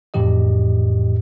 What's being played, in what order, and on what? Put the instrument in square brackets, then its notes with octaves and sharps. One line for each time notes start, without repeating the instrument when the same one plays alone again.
[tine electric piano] F2 A2 E3 G4 D#5